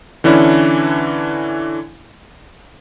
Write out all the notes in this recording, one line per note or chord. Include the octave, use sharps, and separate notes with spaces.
D3 E3 C#4 D4 E4